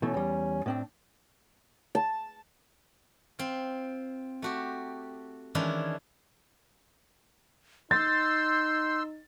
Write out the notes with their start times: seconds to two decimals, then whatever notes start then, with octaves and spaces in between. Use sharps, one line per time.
0.02 B2 E3 A3 C#4
0.14 E2 G3
0.66 A2 C4 D4
1.95 A5
3.39 C4 F4
4.42 A3 F#4 G4
5.55 D#3 E3 G#3 C#4 D4 E4
7.91 D#4 C6 E6 G6 A6